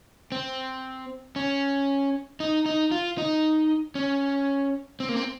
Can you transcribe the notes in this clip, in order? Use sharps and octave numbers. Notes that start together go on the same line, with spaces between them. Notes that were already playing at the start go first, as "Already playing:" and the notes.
C4
C#4
D#4
D#4
F4
D#4
C#4
C4
A#3
C4